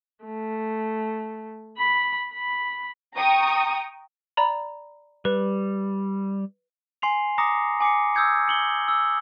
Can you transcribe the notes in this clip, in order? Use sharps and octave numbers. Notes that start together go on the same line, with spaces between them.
A3
B5
B5
G5 A#5 C#6 D#6
D5 A#5 B5
G3 B4
G#5 C6 C7 F7
A#5 D6 D#6 A#6 C#7
G#5 D6 C7 C#7
D#6 E6 G6 G#6 C#7
C#7 F#7 G7
E6